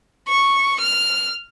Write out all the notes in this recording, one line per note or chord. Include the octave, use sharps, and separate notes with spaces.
C#6
F6